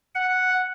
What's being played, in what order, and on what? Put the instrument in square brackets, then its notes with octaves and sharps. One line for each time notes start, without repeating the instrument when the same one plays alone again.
[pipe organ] F#5